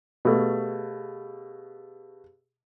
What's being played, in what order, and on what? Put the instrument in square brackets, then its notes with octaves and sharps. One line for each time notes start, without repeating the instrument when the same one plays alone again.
[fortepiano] B2 A3 [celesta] G4 G#4 F5